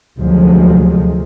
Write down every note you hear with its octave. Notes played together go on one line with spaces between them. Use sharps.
D2 C3 F3 F#3 G#3